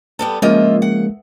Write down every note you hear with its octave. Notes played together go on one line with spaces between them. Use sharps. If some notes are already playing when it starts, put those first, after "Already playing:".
G3 B3 A4
C#3 F3 G#3 A#3 F4 D#5 E5
F#5